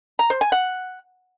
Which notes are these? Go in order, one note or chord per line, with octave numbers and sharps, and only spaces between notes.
A#5
C5
G#5
F#5